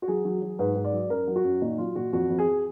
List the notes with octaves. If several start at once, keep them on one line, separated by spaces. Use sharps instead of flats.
F#4
F#3 G#4
F#3
F#3
G#2 B4
G#2
D5
F#3
F#2 A#4
F#3
F#4
F#2
A#2 D#4
F#3 F4
A#2 F#4
F2 F#4
F2
G#4